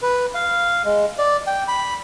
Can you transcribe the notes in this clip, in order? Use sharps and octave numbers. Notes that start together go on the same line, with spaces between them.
B4
F5
G#3
D5
G5
B5